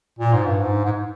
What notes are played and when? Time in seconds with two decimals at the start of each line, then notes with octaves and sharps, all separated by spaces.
0.19 A#2
0.33 G#2
0.46 G2
0.59 G#2
0.85 G#2